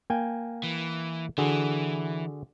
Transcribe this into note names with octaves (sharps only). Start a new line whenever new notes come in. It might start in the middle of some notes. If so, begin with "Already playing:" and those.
A#3 G5 G#5
E3
D3 E3 F#4 G#4